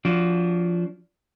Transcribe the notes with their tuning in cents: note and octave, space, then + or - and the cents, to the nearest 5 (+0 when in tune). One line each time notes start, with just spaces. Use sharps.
F3 +0 D4 -25 F#4 +10